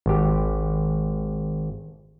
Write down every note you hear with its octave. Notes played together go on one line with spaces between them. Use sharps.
G#1 G4